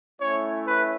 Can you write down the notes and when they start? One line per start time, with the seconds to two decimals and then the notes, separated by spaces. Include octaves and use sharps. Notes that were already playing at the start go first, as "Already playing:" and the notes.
0.21 A3 C#4 E4 C#5
0.67 B4